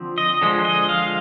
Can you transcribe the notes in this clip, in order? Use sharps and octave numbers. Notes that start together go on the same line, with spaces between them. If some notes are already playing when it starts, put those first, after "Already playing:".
Already playing: D3 F3 C4
D#5
D3 F3 G#3
D#5
F5